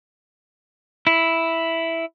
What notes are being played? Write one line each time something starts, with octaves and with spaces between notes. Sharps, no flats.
E4